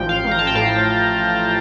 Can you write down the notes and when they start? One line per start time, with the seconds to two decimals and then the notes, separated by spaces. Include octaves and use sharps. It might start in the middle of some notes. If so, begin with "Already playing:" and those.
Already playing: A1 F3 G5
0.09 F5
0.24 A1
0.31 A#5
0.39 A5
0.47 G5
0.55 A2 F5